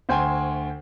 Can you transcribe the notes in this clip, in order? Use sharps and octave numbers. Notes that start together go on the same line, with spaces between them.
D2 C5 G5 G#5